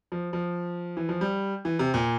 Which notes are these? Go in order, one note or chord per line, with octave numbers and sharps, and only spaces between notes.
F3
F3
E3
F3
G3
E3
C3
A#2